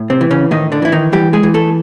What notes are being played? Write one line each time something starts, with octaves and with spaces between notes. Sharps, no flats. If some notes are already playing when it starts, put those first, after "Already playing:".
Already playing: A2
C3 C4
E3
C#3 C#4
A2 D#3 D#4
D3 D4
E3 E4
D#3 D#4
E3 G3 G4
G#3 G#4
E3
A3 A4